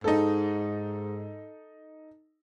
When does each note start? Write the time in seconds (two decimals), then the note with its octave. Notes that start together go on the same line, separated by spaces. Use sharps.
0.04 G#2 D#4 A4